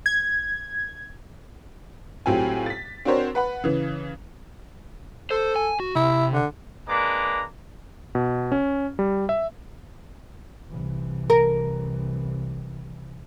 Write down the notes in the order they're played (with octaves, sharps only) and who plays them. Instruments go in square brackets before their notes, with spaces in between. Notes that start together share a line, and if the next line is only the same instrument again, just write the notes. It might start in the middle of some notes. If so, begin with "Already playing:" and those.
[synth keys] G#6
[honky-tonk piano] A2 F#3 C4 F4 G4 G#5
A6 B6
C4 D4 F#4 A#4 C5 C#5
B4 F#5 B5
C#3 E3
[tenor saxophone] A4 [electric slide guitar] C5
[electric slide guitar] G#5
F#4
[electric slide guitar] C3 [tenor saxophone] E4
[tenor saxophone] D3
[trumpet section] G#3 A#3 D4 B4 A#5 D6
[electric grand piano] B2
C#4
G3
E5
[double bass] C2 E3
[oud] A#4